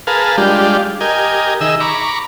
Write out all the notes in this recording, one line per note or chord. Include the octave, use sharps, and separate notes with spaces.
G#4 A#4 B4 F5 A5
G3 G#3 D4 F4 G4
G4 A#4 D#5 G#5
D#3 G#4 D#5 E5 E6
A#5 B5 C#6 D6